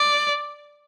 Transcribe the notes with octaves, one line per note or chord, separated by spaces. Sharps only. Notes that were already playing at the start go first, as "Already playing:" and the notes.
Already playing: D5